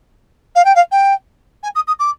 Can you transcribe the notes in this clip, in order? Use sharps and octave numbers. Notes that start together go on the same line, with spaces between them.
F5
G5
F5
G5
G#5
D#6
D#6
D6